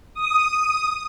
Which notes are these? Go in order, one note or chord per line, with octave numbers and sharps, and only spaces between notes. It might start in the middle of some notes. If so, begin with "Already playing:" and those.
D#6